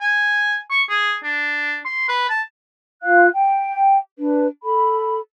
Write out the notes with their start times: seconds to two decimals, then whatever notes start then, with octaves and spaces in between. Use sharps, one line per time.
0.01 G#5
0.71 C#6
0.90 G#4
1.24 D4
1.85 C6
2.08 B4
2.29 A5
3.03 F4 F5 F#6
3.34 G5
4.18 D4 B4
4.63 A4 B5